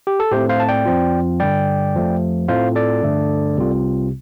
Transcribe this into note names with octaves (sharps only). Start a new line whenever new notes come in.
G4
A4
A2 A3 C4 G4 C5
C5 F5
A5
D5 G5
F2 F3 C4 F4
G2 D3 G3 D5 G5
F2 F3 A3
A2 A3 C4 F4 C5 F5
A4 D5
G2 D3 A3 D4
C2 C3 G3 C4 F4